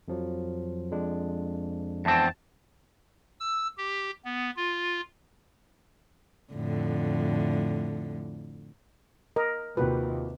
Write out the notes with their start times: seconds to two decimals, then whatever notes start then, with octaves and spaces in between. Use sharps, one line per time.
0.08 F2 F3 F#3
0.91 F2 G#3 D4
2.05 E2 C4 A5
3.40 E6
3.78 G4
4.25 B3
4.56 F4
6.53 F2 A2 D3
9.36 A#4 D#5
9.77 D#2 C3 F4 F#4 B4 G5